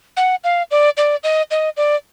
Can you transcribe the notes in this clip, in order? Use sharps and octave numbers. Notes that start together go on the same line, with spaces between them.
F#5
F5
D5
D5
D#5
D#5
D5